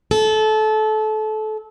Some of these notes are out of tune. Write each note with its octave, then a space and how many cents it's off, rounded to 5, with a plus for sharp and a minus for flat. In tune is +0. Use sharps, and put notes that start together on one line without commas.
A4 -25